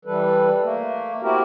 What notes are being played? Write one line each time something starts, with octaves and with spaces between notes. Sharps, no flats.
E3 G3 A4 B4
A3 A#3
A3 C4 E4 F#4 G4 A#4